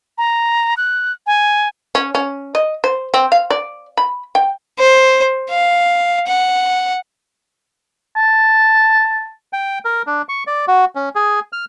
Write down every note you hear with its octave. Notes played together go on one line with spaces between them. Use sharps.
A#5
F#6
G#5
C#4
C#4
D#5
C5
C4
F5
D5
B5
G5
C5
F5
F#5
A5
G5
A#4
D4
C#6
D5
F#4
C#4
G#4
F6